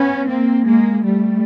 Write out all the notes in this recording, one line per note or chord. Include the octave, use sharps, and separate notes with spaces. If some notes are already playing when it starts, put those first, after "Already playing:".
Already playing: B3 C#4
A#3 C4
G#3 A#3
G3 A3